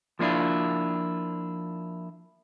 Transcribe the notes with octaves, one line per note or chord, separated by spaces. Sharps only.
F3 A#3 D4 E4 F4